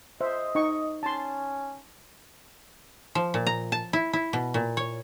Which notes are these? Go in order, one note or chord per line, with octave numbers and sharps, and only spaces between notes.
C5 D#5 E5
D#4 C#6
C#4 A5 C6
F3
A#2
A#5
A5
E4
E4
B2
A#2
C#5